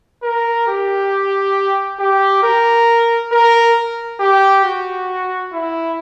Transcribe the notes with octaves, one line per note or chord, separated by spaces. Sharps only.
A#4
G4
G4
A#4
A#4
G4
F#4
E4